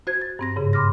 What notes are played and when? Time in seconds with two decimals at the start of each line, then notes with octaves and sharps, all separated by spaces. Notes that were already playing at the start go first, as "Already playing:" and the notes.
0.07 F#4 C5 G#6
0.22 A6
0.39 G2 C4 A#6
0.56 G#2 C#3
0.73 B5 C6 D6 F6 A#6